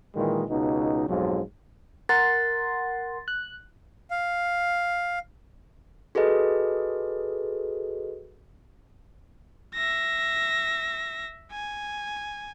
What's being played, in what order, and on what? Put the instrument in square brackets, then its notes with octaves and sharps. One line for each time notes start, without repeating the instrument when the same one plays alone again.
[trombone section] A#2 D#3 E3 F#3 G#3
C#2 B2 D#4
B1 F2 G#2 F3 F#3
[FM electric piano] A#4 F#5 C6 [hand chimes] A6
[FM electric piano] F#6
[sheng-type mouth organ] F5
[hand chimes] F#4 G#4 A4 B4 D#5
[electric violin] E5 A#6
G#5